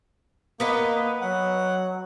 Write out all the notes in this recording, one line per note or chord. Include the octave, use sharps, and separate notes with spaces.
A#3 B3 B4 D#5
F#3 F#5